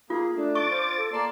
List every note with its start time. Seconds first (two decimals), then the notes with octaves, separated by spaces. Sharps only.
0.10 A#3 F4 G#4
0.36 A3 D4
0.55 C#6 D6 A6
0.70 F4 C5
0.97 A4
1.13 A#3 D5 A5 C6